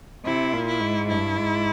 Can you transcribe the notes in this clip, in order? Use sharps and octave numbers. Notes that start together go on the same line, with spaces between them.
C3 E4
A#2
E4
G#2
G2 E4
G#2